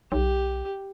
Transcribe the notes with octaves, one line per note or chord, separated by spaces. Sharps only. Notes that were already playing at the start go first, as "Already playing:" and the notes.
B1 G4